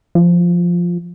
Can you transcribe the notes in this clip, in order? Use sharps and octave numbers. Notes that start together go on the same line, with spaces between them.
F3